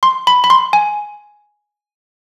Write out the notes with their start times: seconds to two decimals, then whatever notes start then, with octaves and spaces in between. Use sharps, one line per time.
0.03 C6
0.27 B5
0.44 B5
0.50 C6
0.73 G#5